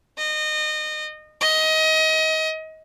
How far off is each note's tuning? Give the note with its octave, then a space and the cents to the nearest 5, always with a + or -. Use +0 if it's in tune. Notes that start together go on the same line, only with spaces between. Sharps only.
D#5 -25
D#5 +25